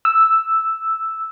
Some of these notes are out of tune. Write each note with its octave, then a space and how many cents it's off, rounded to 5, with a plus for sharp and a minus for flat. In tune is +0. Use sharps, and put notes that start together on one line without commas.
E6 +0